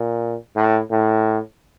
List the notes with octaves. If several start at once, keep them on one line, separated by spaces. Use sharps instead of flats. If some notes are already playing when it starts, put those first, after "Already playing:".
Already playing: A#2
A2
A2